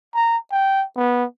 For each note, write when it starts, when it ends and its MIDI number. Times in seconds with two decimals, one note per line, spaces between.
0.14 0.37 82
0.51 0.84 79
0.96 1.24 59